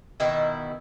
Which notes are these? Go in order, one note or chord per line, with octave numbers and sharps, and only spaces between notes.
B2 D#3 E4